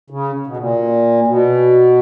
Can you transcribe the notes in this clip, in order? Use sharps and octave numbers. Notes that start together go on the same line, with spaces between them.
C#3
B2
A#2
B2